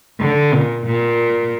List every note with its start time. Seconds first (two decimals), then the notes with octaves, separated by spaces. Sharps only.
0.21 D3
0.54 A#2
0.87 A#2